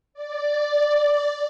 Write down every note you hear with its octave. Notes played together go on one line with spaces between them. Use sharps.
D5